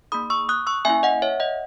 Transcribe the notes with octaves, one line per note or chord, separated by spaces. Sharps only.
A#3 D#4 G#4 B5 D#6
C#6 E6
D#6 F#6
C#6 E6
A#3 C#4 E4 E5 G#5
D#5 F#5
C#5 E5
D#5 F#5